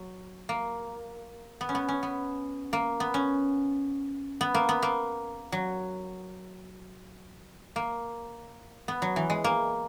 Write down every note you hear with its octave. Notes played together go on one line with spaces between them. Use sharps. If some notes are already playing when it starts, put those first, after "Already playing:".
Already playing: F#3
A#3
B3
C#4
B3
C#4
B3
A#3
B3
C#4
B3
A#3
B3
A#3
F#3
A#3
B3
F#3
E3
G#3
A#3